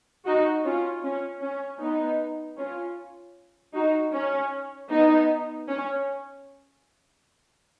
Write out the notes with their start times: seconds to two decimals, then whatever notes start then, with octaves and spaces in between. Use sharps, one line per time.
0.26 D#4 F#4
0.65 C#4 F4
1.04 C#4
1.42 C#4
1.81 B3 D#4
2.58 C#4 F4
3.75 D#4 F#4
4.13 C#4
4.91 B3 D#4
5.69 C#4